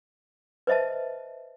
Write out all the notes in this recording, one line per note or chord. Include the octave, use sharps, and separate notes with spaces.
B4 C5 D#5 E5 A5